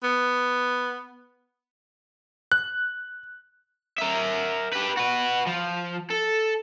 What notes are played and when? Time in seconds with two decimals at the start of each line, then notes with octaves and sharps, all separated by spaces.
0.03 B3
2.52 F#6
3.98 A#4 E5
4.73 G4 B4
4.97 F#4 B4
5.47 F3
6.10 A4